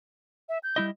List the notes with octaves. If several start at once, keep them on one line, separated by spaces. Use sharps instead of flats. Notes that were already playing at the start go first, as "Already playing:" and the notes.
E5
G6
G3 E4 D#5